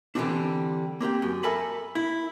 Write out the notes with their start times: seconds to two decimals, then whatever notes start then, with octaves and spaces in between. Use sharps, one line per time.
0.15 D3 E3 G3 A3 C4 D4
1.01 A#3 C4 G4 G5
1.22 F#2
1.43 A4 A#4 E5 G#5 A5 B5
1.95 E4